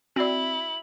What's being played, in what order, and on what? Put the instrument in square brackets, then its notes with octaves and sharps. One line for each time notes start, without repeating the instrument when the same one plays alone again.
[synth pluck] C4 [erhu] E4 [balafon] F#4 D5 [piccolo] F#7